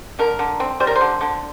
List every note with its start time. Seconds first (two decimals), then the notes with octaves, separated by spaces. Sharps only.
0.19 D3 A#4
0.39 D3
0.60 C4
0.80 G3 C5
0.87 A#4
0.96 C5
1.01 D3
1.21 D3